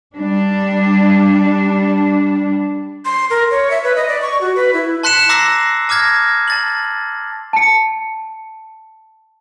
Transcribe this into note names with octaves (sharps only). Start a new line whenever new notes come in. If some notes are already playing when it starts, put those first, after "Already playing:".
G3 D4
C6
A#4
C#5
E5
B4
D#5
D5
C#6
F#4
B4
E4
A5 C6 F#6 B6 C#7 E7
A#5 D6 E6 A#6 C7 F#7
A5 D6 F6 G#6 A#6
A5 A6 F#7
A5 C#7